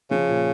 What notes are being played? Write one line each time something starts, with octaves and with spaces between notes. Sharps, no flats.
C#3 F3
A#2